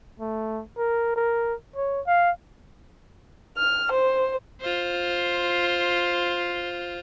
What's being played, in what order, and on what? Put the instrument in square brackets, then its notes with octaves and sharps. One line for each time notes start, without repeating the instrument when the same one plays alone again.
[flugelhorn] A3
A#4
A#4
C#5
F5
[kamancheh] F6
C5
[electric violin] F4 C5